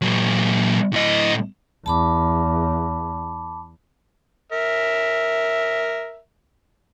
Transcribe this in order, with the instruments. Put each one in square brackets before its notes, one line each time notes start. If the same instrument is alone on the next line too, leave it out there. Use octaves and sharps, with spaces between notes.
[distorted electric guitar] A#2 F#3
A2 D#5
[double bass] E2 [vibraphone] A5 B5 D6
[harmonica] A#4 E5